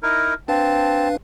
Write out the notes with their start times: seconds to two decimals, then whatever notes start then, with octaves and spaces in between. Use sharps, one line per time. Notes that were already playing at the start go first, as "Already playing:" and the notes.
0.03 D#4 E4 A#4
0.48 C4 D4 B4 F5 A5